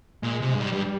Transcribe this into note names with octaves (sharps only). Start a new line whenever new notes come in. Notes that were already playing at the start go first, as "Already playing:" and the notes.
A#2 G#3
C3
G2 G#3
G#2 G3
G2